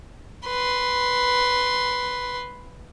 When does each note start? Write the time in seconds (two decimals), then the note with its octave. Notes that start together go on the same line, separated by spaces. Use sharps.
0.46 B4 C6